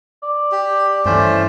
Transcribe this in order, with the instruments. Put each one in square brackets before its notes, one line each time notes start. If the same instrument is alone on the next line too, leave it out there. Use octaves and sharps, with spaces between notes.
[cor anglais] D5
[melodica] G4
[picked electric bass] G2 E3 [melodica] A3 C#4 C5